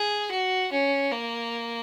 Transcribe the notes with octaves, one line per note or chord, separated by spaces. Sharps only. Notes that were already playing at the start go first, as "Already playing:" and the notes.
Already playing: G#4
F#4
C#4
A#3